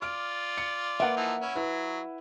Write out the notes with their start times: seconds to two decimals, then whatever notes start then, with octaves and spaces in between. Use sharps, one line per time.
0.02 F4 D5 F6 D7
0.58 C#7
1.00 A#3 B4 E5 F#5 D7
1.17 E3 F3 D#4
1.41 C#4 E4
1.56 F#3 E4 B4